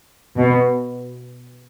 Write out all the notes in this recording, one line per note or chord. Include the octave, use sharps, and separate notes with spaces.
B2